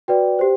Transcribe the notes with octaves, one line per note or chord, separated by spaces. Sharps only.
F#4 B4 D5 G5
G4 C5